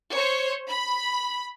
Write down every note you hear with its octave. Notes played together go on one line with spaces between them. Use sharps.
C5 C#5
B5